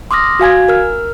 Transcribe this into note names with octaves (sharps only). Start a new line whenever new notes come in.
C6 D6 D#6 F6 A#6
F#4 F5 G#5 G#6
A#4 F6